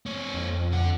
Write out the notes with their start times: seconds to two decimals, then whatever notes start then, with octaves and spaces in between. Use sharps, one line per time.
0.06 C4 C#5
0.34 F2
0.72 D3 F#5